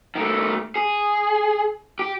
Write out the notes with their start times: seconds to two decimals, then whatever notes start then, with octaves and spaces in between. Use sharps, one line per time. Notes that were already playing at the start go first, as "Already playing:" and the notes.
0.15 D#3 A3
0.76 G#4
1.99 G4